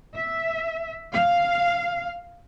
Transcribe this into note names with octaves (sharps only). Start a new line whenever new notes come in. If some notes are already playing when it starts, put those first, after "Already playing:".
E5
F5